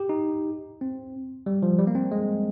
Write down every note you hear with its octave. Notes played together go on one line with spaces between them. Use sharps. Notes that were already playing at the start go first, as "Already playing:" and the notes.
Already playing: G4
D#4
C4
G3
F3
G3
A#3
C4
G#3